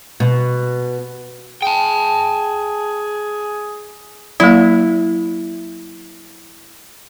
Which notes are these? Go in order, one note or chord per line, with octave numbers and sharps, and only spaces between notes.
B2
G#4 G5 A5
F#3 A#3 E4